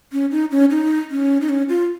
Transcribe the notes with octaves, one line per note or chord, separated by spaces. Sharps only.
C#4
D#4
C#4
D#4
C#4
D#4
C#4
F4